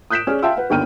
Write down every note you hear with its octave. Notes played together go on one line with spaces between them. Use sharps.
D#6 F#6 G6 B6 D7 E7
C#4 G#4 D5 F6
E5 F5 G5 A5 C6 E6
B4 F#5
G1 D#2 D3 G5 F6 D#7